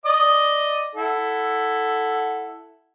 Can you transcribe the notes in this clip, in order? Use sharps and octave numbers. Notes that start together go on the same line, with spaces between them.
D5 D#5 D#6
E4 A4 F#5